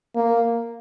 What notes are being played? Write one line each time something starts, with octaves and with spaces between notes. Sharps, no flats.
A#3